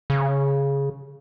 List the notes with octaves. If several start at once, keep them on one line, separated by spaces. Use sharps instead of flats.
C#3